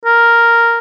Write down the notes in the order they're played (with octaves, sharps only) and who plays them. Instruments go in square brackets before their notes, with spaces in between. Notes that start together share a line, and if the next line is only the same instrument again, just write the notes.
[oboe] A#4